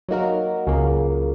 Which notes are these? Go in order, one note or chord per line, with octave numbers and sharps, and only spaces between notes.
F#3 A#3 D#4 F#4 A#4
C#2 C#3 F#3 A#3